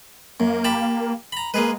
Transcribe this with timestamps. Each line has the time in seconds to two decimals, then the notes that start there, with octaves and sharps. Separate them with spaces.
0.40 F#2 A#3
0.64 G4 A5 B5
1.32 A#5 B5
1.54 G#3 A#3 G#4 B4